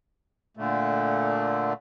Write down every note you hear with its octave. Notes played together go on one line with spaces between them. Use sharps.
A#2 D3 A3